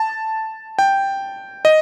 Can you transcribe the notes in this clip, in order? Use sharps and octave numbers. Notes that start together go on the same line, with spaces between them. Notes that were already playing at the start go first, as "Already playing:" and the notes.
Already playing: A5
G5
D#5